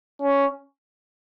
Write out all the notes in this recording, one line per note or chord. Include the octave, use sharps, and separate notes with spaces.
C#4